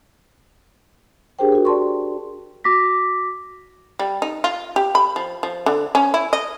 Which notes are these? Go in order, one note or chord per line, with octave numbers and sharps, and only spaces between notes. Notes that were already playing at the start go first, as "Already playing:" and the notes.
D4 G4 G#4 A#4 C5 G5
F#4 A#4
D5 A5 C6 C#6
F#4 D6 A#6 B6
G3
D#4
F4
G4
B5
F3
F3
D3
C#4
E4
D#5